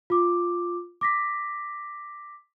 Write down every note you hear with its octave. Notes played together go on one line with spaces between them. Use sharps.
F4 D6
D6 A#6 B6